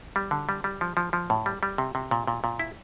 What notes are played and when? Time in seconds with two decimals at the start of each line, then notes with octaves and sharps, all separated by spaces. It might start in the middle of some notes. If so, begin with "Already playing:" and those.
0.16 G3
0.31 D3
0.49 G3
0.64 G3
0.81 F3
0.97 F3
1.13 F3
1.30 A2
1.46 G3
1.63 G3
1.78 C3
1.95 C3
2.11 A#2
2.28 A#2
2.44 A#2
2.59 E4